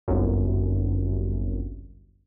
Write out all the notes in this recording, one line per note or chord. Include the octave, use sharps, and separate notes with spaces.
G1 C2 F#2